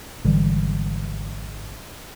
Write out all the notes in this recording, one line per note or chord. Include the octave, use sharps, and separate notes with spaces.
G#1 D3 E3 G3